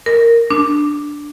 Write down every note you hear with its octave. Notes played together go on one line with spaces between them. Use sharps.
A#4
D4